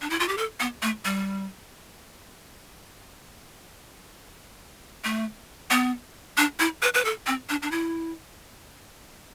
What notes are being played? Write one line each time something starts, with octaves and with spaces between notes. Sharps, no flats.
D4
E4
F4
G4
A4
B3
A3
G3
A3
B3
D4
E4
B4
B4
A4
C4
D4
D4
E4